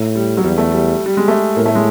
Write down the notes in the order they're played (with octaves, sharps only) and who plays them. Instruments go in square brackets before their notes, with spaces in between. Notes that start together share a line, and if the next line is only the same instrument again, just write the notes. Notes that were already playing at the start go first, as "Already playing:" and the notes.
Already playing: [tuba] A2
[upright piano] G3
F#3
[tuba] E2 [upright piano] G3
[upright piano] A3
G3
G3
G#3
A3
[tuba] A2 [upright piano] A#3
[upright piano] A3
G#3